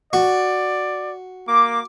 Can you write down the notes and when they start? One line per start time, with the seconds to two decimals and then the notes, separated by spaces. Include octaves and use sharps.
0.13 F#4 D5
1.48 A#3 D6